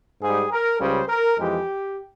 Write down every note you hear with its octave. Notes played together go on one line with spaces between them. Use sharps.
G#2 G3 G#4
A#4
C#2 C#3 G3 C5
A#4
F2 E3 G#3 G4